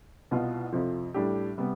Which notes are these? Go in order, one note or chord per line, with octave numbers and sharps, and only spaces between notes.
C2 B2 B3 F4
F2 C3 F3
A2 G3 D4 G4
C3 G3 B3